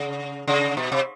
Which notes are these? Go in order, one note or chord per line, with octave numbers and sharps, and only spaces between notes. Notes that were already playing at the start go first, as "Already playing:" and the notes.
Already playing: C#3
C#3
B2
C3